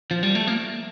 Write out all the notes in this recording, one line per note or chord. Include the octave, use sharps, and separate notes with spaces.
F3
G3
A3
A#3